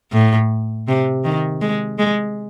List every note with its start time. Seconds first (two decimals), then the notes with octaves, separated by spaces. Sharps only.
0.13 A2
0.88 C3
1.25 D#3
1.62 G#3
1.99 G#3